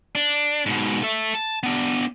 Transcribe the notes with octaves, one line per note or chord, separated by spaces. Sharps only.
D4
G#2 B2
A4 E5
A5
B3 D4